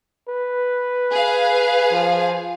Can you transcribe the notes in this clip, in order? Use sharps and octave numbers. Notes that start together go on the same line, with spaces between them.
B4
G#4 F5
F3